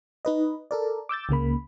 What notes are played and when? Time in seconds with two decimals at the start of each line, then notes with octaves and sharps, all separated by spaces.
0.25 D#4 B4 D#5
0.71 A4 A#4 D5
1.09 D6 E6 G6 A6
1.29 C#2 C#3 A#3 B5